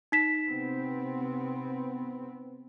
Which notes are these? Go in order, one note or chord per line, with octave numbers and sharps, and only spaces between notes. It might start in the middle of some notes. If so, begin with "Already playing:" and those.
D#4 B6 E7
C3 B3 C4